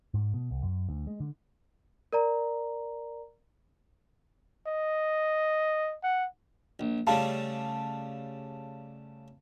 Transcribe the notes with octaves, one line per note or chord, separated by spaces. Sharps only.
G#2
B2
C2
F#2
D2
G#3
D3
A#4 D5 A#5
D#5
F#5
A#1
C#3 G3 A3 F5 A5